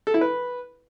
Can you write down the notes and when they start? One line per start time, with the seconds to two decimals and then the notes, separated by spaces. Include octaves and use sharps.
0.07 A4
0.14 E4
0.21 B4